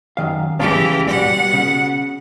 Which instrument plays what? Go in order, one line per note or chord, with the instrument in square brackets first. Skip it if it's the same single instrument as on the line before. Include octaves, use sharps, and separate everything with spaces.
[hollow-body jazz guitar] F#2 D#3 F5
[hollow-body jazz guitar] C#3 F5 A5 [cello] E3 G4
[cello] B2 F#5 [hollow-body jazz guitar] G3
[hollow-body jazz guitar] C#3